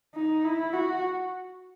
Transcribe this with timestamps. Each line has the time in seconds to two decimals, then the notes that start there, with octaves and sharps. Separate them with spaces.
0.15 D#4
0.45 E4
0.73 F#4